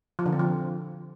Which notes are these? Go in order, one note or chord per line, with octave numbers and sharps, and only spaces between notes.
F3
D3
C4
F3